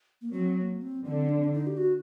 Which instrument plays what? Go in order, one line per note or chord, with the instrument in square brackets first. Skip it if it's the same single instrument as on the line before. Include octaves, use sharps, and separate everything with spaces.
[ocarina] A#3
[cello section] F#3 [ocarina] C4
[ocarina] C4
A#3
C4
[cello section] D3 [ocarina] C4
[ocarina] D4
C4
D4
D#4
G4
F#4